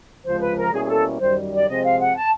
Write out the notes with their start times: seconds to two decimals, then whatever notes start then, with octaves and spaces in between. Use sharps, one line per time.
0.25 C#2 C3 F3 G#3 C5
0.41 B4
0.56 A#4
0.72 B2 G3 A#3 C#4 E4 G#4
0.82 G#4
0.88 A4
1.20 F#2 D#3 G3 C5
1.52 D5
1.67 C3 F3 G#3 C4 D#5
1.83 F5
1.99 F#5
2.15 A5